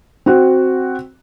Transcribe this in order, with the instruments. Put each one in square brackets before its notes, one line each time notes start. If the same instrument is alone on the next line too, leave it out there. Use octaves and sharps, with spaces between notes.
[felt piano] C4 F#4